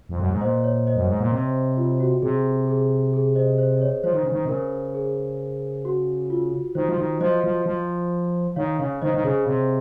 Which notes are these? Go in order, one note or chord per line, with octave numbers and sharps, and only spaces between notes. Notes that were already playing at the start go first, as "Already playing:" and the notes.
F2
F#2
G#2
A#2 C5 D#5
C#5
C5 D#5
F#2
G#2
A#2
C3
F4
F#4
C3 G#4
G#4
G#4
C5 D#5
C5
D#5
C#5
F3 C5
D#3
C#3
D#3
C3
C#3 A#4
G#4
F#4
F4
D#3 C5
F3
D#3
F3 C5 D#5
F3
F3
D#3 C#5 F5
C#3 C#5 F5
D#3 C5 D#5
D#3
C#3 G#4
C3